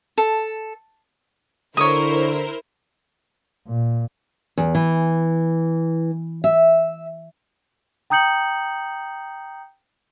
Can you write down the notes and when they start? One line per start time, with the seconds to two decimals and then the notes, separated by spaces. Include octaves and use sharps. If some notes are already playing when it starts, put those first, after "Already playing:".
0.18 A4
1.77 D3 E4 A#4 C5 C#5 D#6
3.67 A#2
4.58 E2
4.75 E3
6.44 E5
8.10 G5 A#5 D#6 G6 C#7 F#7